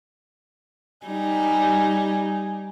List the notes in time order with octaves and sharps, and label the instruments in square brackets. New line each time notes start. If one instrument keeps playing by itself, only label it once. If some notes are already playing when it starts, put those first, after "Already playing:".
[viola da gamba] G3 D#4 [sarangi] G#5